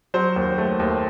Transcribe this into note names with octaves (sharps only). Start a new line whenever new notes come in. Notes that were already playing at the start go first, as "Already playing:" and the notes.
F#3 C5
D#2
A3
D#2